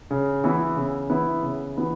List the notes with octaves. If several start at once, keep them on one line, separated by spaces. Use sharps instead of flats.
C#3
E3 B3 E4
C#3
E3 B3 E4
C#3
E3 B3 E4